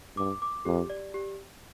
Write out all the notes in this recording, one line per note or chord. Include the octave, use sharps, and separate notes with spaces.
G2 D6
D6
F2 G4
D5
G4